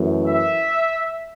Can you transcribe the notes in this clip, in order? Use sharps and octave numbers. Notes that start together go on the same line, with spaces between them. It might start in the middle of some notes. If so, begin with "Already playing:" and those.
Already playing: F#2 E3 A3
E5